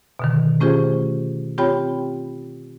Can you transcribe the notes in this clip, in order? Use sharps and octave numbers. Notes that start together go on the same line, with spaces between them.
B2 D3 D#3
A3 C#4 F4 G4 G#4 C5
C4 F4 G4 C#5 G5 B5